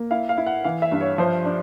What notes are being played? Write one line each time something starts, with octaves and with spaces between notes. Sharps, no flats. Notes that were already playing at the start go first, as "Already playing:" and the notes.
Already playing: A#3
E4 F5
F5
E4
F#5
E3 F5
E5
G2
C#5
F3 C5
D4